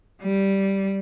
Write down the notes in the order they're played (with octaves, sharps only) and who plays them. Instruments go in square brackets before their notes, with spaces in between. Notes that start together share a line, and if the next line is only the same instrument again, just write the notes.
[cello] G3